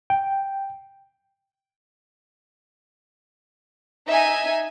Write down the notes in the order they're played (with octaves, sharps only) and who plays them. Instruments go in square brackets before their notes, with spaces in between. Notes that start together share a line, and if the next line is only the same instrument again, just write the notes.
[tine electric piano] G5
[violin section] D#4 E5 G#5